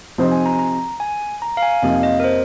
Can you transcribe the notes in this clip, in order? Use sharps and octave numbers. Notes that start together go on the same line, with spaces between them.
C3 F3 C4 D#4 C5
G#5
A#5
A#5
G#5
A#5
F5
G#5
F2 C3 F3 A#3 D#4 F5
D#5
A#4
C5